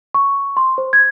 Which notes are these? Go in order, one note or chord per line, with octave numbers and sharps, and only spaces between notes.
C#6
C6
C5
G#6